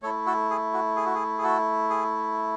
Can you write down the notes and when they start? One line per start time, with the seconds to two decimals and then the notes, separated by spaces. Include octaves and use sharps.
0.02 A3 E4 A4 C#5
0.26 F#4 A4
0.50 G#4
0.73 F#4
0.96 G#4
1.06 F#4
1.15 G#4
1.38 G#4
1.44 F#4 A4
1.90 G#4